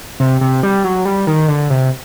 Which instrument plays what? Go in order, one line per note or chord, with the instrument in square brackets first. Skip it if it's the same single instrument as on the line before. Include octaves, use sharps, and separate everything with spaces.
[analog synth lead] C3
C3
G3
F#3
G3
D#3
D3
C3